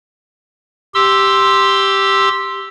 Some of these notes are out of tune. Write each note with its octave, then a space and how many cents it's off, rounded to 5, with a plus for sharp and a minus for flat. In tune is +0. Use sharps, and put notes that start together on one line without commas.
G4 +0 C6 +0 E6 +0